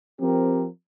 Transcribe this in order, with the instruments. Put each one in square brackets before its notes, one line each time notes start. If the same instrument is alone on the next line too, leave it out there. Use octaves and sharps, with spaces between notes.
[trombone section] F3 C4 G4 A#4